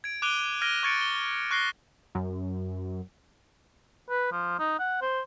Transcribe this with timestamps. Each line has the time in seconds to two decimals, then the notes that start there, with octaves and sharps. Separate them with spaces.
0.04 G#6 D7
0.22 D6 F#6 D7 D#7 F7 G7
0.61 F6 G#6 A#6 D7 D#7 G7
0.83 C#6 F#6 G#6 A6 C#7 D7
1.01 G7
1.51 C#6 F#6 A#6 C7 G7
2.15 F#2
4.10 B4
4.32 F3
4.59 D#4
4.79 F#5
5.02 C5